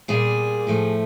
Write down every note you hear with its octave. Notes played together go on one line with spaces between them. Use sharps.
A#2 G3 A#3 G#4
A2 F3 A3